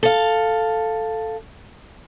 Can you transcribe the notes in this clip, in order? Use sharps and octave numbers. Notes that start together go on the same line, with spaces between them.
A4 F5